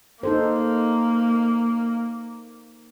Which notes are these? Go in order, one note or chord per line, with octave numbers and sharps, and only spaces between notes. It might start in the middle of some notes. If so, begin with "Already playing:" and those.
A#3 D#4 A4 C5